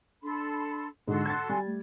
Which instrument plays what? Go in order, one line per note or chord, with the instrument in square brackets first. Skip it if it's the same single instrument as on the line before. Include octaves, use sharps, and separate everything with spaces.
[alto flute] D4 [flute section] A4 B5 C6
[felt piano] G#2 D3 G#3 [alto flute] D4 [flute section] F#4 A4 C6
[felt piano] G#6 A6
[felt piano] G3 [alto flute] G#5
[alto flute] A3